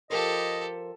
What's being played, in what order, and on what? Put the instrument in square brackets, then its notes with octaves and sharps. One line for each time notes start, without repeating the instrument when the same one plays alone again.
[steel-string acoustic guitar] F3 A#4 C5 [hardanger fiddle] G4 A4 [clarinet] D#5